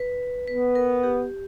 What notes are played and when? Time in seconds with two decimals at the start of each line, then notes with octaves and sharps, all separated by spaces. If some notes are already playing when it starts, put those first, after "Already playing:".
Already playing: B4
0.47 B3 B4
0.75 A#4
1.03 G4